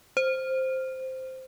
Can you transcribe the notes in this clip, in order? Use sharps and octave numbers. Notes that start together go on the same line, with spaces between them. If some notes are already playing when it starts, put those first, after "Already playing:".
C5